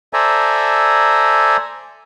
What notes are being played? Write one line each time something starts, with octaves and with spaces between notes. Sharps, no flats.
A4 C5 D5 E5 G#5 A#5